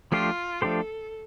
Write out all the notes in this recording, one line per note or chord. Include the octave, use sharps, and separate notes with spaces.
F3 A3 D4 F4 G4 C5
F3 A3 D4 G4 A4 C5